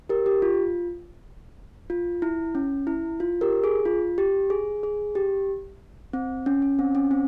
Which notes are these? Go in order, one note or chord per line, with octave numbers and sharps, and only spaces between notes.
G4 A#4
G4
F4
F4
E4
C#4
E4
F4
G4 A#4
G#4
F4
G4
G#4
G#4
G4
C4
C#4
C#4
C4
C#4
C4